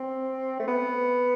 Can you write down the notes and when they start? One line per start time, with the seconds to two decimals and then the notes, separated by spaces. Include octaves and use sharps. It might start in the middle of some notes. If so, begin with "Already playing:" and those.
Already playing: C4
0.60 A3
0.68 B3